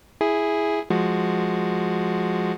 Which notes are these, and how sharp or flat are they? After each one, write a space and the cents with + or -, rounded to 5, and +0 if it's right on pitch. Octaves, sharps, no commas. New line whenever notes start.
E4 +0 G#4 +0
F3 +0 G#3 +0 F#4 +0